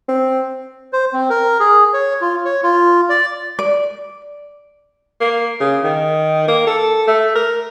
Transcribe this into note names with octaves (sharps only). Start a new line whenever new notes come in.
C4
C5
C4
A#4
G#4
C#5
F4
C#5
F4
D5
D5
A#3
C#3
D#3
A#3
A4
A3
A#4